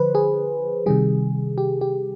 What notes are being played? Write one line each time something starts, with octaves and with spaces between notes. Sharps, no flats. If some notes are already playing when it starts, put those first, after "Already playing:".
Already playing: D3 F3 B4 C5
G#4
C3 D#3 G3 G#4
G4
G4